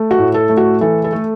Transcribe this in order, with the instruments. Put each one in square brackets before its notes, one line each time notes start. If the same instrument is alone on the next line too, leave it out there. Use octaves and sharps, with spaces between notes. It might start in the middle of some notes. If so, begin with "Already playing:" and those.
Already playing: [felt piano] A3
F#4
A2
A4
A3
F#4
E3 A4
A4
A3